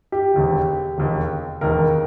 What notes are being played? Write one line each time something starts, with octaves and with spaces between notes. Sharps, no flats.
G4
E1 D#2 D#3
E1 D#2 D#3
E1 D#2 D#3 A#4